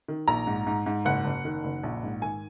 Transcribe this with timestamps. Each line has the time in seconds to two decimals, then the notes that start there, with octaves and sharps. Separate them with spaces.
0.08 D#3
0.28 A#1 A#5
0.47 G#2
0.67 G#2
0.86 G#2
1.05 F#1 F#5
1.25 F#1
1.45 D#3
1.64 F#1
1.83 A#1
2.03 G#2
2.22 D#3 G#5